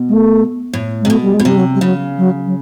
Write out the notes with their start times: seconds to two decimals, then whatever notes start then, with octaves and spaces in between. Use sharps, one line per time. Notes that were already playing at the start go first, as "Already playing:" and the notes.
Already playing: B2
0.09 G#3
0.13 A3
0.73 A2
1.01 G#3
1.05 C3
1.10 B2 A3
1.23 G3
1.34 G#3
1.39 B2
1.45 C3 G3
1.57 F#3
1.74 G3
1.81 C#3 F#3
2.18 F#3
2.46 F#3